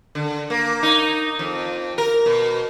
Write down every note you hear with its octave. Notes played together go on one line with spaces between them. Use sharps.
D3
A#3
D#4
F2
A#4
B2